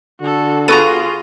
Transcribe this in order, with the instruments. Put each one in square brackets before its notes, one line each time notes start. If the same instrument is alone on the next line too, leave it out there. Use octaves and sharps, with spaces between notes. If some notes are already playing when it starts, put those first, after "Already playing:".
[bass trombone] D3 [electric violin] F#4 A4
[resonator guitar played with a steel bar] B3 F#4 A#5 [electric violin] F4 G#4 [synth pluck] A4 D#7